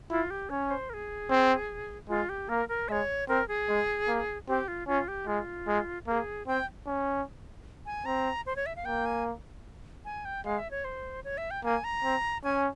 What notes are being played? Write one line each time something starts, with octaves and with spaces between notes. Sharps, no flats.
E4 F4
G4
C#4 C#5
C5
A#4
G#4
C4
G#3 F4
G4
A#3 A#4
A#4
G#3 C#5 E5
C4 A#4
G#4
G#3
A#3
C4 G4
F4
C#4 F4
G4
G#3 F4
G#3
A#3 G#4 A#4
C4 G5
C#4
G#5
C4 A#5
C5
C#5
E5
F5
A#3 G5
G#5
G#5
G5
G#3 F5
E5
C#5
C5
C#5
E5
G5
A#3 G#5
A#5
C4
C#4 G#5